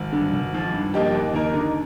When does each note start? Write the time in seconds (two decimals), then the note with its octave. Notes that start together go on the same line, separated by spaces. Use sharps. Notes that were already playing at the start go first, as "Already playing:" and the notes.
Already playing: G#1
0.13 G2 D3
0.33 G#1
0.53 G#2 F3
0.73 G2
0.94 F3 A#3 D#4 G4
1.14 D#2
1.33 D#3 A#3 D#4 A#4
1.54 D3